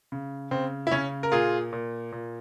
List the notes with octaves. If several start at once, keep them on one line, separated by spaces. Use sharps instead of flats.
C#3
C#3 C4
E4
C#3 C#4
A#4
A#2 F4 G#4
A#2
A#2